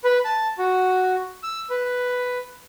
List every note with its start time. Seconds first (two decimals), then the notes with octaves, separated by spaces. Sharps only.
0.04 B4
0.25 A5
0.58 F#4
1.43 E6
1.70 B4